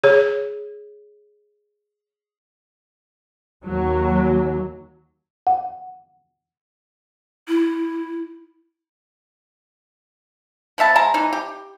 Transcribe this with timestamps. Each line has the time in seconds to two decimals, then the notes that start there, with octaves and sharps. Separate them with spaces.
0.04 G#4 C#5
3.64 D#2 F#3
5.47 F#5
7.48 E4
10.78 F3 B3 E5 A5
10.96 G#3 A5 A#5
11.14 E3 D#4
11.33 G4